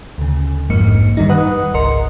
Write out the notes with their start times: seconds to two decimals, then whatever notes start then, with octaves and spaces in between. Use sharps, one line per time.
0.18 D2 C#3
0.70 A#1 F2 G#2 A#3 C#7
1.17 G2 D#3 G3 D#4
1.29 B4 F#5 D#6 F#6
1.74 G#1 C#2 A#4 D#5 C6 C#7